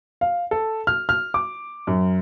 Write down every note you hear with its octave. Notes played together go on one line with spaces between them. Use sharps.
F5
A4
F6
F6
D6
F#2